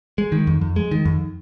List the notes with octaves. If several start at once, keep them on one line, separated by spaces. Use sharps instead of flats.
G#3
D#3
F2
F2
G#3
D#3
F2